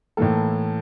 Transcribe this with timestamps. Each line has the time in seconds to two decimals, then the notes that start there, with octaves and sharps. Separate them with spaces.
0.17 A2 E3 A#3 A4